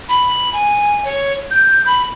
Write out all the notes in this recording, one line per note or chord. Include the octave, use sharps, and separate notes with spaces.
B5
G#5
C#5
G6
B5